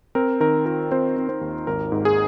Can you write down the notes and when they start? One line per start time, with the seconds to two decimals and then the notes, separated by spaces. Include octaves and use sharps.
0.15 C4 A#4
0.40 D#3 A#4
0.66 F4 A#4
0.91 C4 F4 C5
1.17 C4
1.29 C4 C5
1.41 D#2
1.67 G#1 A#4
1.92 G#2
2.05 G#4